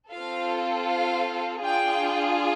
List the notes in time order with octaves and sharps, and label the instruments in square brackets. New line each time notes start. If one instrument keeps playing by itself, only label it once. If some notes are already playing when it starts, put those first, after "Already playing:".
[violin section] C4 F4 A4 F5
F5
D4 F4 G#4 G5